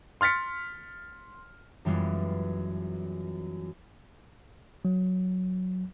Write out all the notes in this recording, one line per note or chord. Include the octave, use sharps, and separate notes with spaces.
C6 F6 A6 B6 C#7
F#2 E3 G3 G#3 B3 F4
F#3